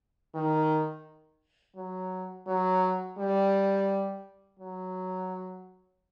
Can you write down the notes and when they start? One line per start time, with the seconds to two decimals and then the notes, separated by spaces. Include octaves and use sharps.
0.34 D#3
1.76 F#3
2.47 F#3
3.18 G3
4.59 F#3